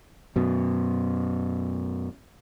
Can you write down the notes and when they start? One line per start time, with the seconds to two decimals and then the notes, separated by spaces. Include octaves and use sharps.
0.36 F#2 B2